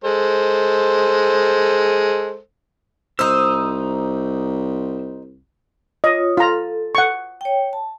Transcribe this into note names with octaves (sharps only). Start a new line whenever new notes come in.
G#3 A4 C5
C2 D#4 C5 D#6 E6
F4 C#5 D#5 D#6
F4 A4 A#5
F#5 C#6
C#5 G5
A5